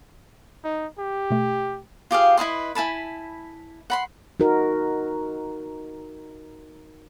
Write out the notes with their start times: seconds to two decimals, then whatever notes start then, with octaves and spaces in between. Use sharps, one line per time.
0.64 D#4
0.98 G4
1.30 B2 A3
2.11 F4 G4 G#4 F5
2.37 E4 B4 D#5 C6
2.75 E4 G#5 A5 B5
3.90 F#5 B5 C6
4.40 D#4 F#4 A#4